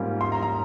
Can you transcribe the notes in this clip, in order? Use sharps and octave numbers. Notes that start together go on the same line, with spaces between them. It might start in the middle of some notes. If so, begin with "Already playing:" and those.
Already playing: G#2 G3 A#3 C#4 F4
C6
A#5
A#5